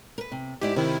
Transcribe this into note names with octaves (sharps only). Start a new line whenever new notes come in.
A#4 B4
C3
G#2 E4 G4 D5
C3 D#3 C4 E4